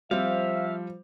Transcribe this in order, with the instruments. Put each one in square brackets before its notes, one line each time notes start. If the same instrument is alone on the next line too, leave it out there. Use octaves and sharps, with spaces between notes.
[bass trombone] F3 [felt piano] G3 C4 [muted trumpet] E5 [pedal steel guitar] F5